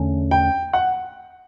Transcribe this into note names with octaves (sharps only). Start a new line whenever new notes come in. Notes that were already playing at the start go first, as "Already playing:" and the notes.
Already playing: E2 D3 A3 C#4
G5
F#5